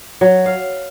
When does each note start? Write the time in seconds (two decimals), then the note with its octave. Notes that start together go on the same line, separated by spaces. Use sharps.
0.21 F#3
0.46 F5